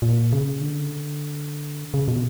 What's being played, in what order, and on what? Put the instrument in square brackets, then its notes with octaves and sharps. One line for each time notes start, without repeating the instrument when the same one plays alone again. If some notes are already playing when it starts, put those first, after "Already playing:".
[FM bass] A#2
C#3
D3
C#3
B2